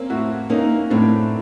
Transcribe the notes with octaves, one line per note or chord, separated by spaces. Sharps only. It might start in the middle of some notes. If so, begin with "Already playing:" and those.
Already playing: A#3 C4 C#4
A2 E4 F#4
A#3 C#4 D#4
A2 C4 D4